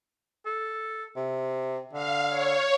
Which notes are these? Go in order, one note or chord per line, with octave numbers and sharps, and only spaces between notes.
A4
C3
D3 F5
C#5